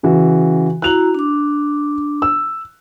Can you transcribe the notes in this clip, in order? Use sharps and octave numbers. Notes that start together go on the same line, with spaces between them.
C#3 E3 F#4
E4 F#4 A#5 F#6 F7 F#7
D4 D6
E6